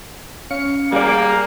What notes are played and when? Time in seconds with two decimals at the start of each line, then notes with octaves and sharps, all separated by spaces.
0.51 C#4 F5 C#7
0.92 G3 A#3 G#4 D5